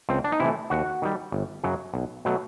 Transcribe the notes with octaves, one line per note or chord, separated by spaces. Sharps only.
C#2 C4
D4
D#4
C3 E3 A3 E4
D#2 F#4
D#3 G3
G1
F#2 C#3 F#3
B1
B2 F#3 A3